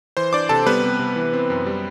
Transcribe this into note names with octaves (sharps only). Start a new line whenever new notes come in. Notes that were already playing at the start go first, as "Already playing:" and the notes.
E3 C5 C6
D4 D5 D6
C3 A4 A5
G3 B3 B4
C3
C3
E3
C4
F#2
G3